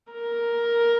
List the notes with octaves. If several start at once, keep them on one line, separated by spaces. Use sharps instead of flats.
A#4